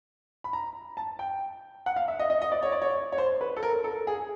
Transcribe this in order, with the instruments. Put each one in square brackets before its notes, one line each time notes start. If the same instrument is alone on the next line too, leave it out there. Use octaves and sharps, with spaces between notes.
[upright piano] B5
A#5
A5
G5
F#5
F5
E5
D#5
D#5
D#5
D5
C#5
D5
C#5
C#5
C5
B4
A4
A#4
A4
G#4